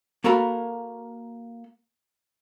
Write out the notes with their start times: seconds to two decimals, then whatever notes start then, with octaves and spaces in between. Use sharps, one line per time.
0.24 A#3 F#4 A4 A#4 A5 B5